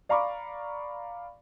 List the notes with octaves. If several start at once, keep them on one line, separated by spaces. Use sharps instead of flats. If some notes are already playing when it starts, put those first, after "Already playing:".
D5 F5 A#5 B5 C#6 D6